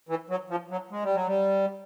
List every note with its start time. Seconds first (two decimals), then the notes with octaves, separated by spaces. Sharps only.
0.09 E3
0.30 F#3
0.50 F3
0.71 F#3
0.92 G#3
1.04 G3
1.15 F#3
1.27 G3